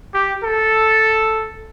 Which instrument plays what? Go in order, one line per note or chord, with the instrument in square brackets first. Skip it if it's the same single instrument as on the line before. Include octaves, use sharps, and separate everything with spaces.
[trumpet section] G4
A4